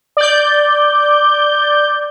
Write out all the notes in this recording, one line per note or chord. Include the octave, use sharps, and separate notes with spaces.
D5 G6